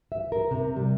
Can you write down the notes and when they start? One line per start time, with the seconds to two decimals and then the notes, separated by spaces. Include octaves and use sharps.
0.12 E5
0.32 A#4
0.51 C3
0.76 G3